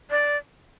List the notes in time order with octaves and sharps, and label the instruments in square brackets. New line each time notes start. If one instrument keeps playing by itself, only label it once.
[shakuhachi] D5